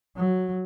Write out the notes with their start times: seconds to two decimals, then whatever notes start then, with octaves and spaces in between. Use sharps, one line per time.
0.17 F#3